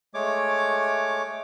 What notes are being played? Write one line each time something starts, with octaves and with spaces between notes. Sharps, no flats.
G#3 A3 C#5 D6